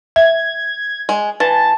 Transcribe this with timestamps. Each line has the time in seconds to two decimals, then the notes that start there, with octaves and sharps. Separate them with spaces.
0.16 E5 G#6
1.09 G#3
1.40 E3 A5